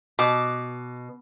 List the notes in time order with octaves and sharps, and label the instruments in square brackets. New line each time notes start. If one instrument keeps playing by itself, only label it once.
[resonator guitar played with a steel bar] B2 [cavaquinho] D6